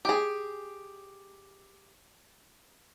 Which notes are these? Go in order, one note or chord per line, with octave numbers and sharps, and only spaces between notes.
G4 G#4